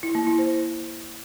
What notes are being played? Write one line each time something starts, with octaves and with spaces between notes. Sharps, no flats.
E4
A#3
E4
C5